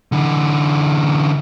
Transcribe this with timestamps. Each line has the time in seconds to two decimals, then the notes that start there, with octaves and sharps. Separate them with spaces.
0.12 D3 E3